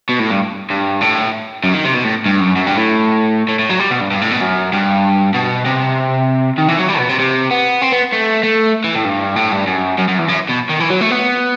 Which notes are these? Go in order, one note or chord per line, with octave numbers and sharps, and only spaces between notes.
B2
A2
G2
G2
A2
F#2
D#3
C3
B2
A2
G2
F#2
F#2
G2
A2
A2
A2
F#3
G3
B2
G2
G2
A2
B2
F#2
G2
B2
C3
D#3
E3
F#3
G3
B2
C3
C3
B3
C4
B3
A3
A3
E3
A2
G2
A2
G2
F#2
F#2
F#2
E2
F#2
B2
D#3
E3
F#3
A3
B3